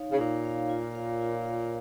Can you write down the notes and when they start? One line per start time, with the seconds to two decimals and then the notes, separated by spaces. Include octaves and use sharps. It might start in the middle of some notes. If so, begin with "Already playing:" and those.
Already playing: D#4 C#5 F5
0.11 C#3
0.17 A#2 D#4
0.44 C#5 F5
0.69 F4
0.95 A#4 C#5 F5
1.21 F4
1.46 A#4 C#5 F5